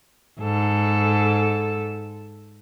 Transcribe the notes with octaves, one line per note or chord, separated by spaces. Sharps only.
G#2 A4